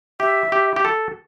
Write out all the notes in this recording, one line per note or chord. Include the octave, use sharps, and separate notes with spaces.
G4 E5
G4
G4
A4